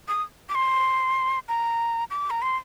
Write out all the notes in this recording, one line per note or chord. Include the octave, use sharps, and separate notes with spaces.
D#6
D6
C6
A#5
D6
A#5
C6